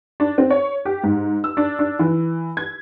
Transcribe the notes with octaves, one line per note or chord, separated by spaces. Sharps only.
D4
C4
C#5
G4
G#2
E6
D4
D4
E3
G#6